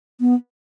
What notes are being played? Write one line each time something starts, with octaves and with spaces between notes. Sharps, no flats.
B3